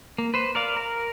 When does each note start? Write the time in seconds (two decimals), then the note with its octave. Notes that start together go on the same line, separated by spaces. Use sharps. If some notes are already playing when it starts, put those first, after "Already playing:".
0.18 A#3
0.34 B4 C5
0.55 A#4 D5 F5
0.77 A#4